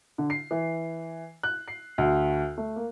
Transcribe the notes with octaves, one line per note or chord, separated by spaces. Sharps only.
D3
C7
E3
F#6
C7
D2
A3
A#3